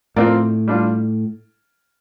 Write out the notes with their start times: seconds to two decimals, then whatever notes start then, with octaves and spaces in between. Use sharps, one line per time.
0.16 A2 F3 C4 F4 A#4 D5
0.68 G3 D4 F4